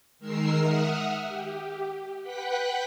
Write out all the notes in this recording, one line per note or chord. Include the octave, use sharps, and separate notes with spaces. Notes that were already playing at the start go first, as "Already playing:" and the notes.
D#3 G#3 A#4 E6 C7
E5 F#5 D#6 F6
G4
B4 F#5 G5 F#6 B6